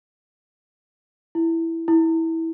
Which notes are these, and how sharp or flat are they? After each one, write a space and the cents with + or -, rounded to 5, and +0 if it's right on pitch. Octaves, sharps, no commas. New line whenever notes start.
E4 +0
E4 -15